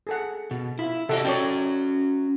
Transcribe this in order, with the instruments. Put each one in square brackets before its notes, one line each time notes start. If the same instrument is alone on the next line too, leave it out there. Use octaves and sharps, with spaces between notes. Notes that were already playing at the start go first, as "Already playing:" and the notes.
[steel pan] G#4 A4 F#5
[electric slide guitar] B2
[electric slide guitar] E4 [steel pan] F4
[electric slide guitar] C3 G4 D#5 [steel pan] A4 E5 F#5
[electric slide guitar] C#4 F#4 [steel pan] C#5 D5 G5